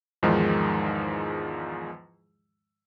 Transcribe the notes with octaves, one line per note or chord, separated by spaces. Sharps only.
E2 G#2 D#3 F3 G#3